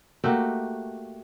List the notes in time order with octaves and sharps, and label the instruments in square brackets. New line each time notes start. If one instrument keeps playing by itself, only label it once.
[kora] A3 A#3 F#4 G4